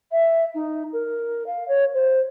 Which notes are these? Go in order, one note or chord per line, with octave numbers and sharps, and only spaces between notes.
E5
D#4
A#4
F5
C#5
C5